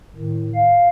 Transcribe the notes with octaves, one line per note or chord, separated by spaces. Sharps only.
A2 D#3
F5